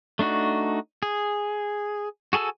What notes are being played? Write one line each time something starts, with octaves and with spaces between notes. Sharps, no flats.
A3 D4 D#4 F#4
G#4
F#4 G#4 A4 G#5 E6